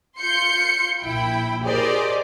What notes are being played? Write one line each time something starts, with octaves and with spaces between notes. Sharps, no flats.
F4 C6 G6 C#7
A#1 E4 G5 B5
G4 G#4 A#4 C5 D5 D#5